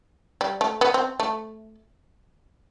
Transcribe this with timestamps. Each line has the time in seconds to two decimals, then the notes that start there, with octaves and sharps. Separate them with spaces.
0.41 G3
0.61 A3
0.81 B3
0.94 C4
1.20 A3